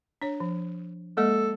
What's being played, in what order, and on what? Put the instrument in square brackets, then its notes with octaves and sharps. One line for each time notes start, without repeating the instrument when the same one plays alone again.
[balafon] D4 C#5
F3
[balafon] G#3 A#3 D#5 [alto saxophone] A4